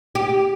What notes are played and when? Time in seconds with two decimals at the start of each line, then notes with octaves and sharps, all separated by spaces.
0.15 G4